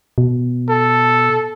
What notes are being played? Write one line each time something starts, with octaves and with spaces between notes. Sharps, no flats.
B2
A4